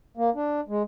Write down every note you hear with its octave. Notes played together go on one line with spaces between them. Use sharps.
A#3
D4
G#3